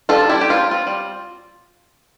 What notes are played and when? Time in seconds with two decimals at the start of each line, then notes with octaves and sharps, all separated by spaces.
0.09 G3 F4 A4
0.25 G3 E4 G4
0.40 G3 G4
0.50 F4
0.56 C4
0.71 C4 F4
0.87 G3